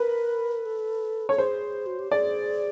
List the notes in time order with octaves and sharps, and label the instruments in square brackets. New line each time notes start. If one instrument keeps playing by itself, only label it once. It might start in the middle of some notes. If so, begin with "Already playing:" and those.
Already playing: [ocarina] A#4 [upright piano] B4
[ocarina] A4
[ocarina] A4 [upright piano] C#5
[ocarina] G#4 [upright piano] C5
[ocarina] F#4
G4
[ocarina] G#4 [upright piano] D5